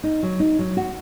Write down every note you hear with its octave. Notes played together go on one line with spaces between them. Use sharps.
D#4
F#3
D#4
F#3
F#4